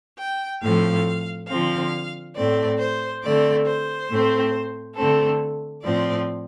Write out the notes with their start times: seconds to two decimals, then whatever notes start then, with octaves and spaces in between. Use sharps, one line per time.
0.19 G5
0.62 A2 F3 A3 C4 F5
1.49 D3 F3 C4 F5
2.35 A2 A3 C4 D5
2.79 C5
3.23 D3 A3 C4 D5
3.66 C5
4.09 A2 A3 C4
4.96 D3 A3 C4 A4
5.83 A2 F3 C4 D5